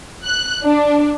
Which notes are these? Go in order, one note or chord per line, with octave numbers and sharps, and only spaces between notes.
F#6
D4